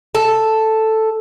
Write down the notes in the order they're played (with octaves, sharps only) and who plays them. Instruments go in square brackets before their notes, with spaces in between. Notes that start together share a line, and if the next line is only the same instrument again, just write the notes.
[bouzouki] A4